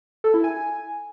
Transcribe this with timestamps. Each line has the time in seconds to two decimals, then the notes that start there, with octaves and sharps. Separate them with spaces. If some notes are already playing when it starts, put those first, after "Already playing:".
0.24 A4
0.34 E4
0.44 G#5